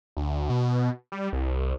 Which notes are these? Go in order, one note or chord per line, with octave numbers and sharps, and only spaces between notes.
D2
B2
G3
C2